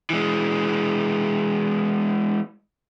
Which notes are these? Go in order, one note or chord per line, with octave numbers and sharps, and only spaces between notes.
E3 G#3